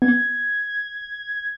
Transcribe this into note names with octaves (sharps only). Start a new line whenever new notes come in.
B3 G#6